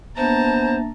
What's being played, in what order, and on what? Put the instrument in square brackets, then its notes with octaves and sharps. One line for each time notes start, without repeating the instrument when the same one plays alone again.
[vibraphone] A#3 D4 E5 [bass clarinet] B3 [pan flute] C5 [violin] A5 A#5